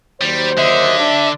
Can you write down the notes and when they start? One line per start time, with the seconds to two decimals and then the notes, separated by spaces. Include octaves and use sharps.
0.21 D#2 F#3 G3 C5
0.58 D3 D#5 E5
0.98 D4